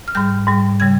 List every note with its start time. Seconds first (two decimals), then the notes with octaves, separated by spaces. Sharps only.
0.08 F6
0.15 G#2 G3 G6
0.47 G#2 G3
0.80 C#3 G3 G#6